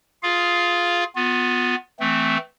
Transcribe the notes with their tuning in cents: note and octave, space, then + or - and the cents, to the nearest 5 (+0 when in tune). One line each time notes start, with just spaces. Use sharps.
F4 +0 G#4 +15 F5 +0
B3 +5 F4 +30
E3 +0 A3 +0 C4 -20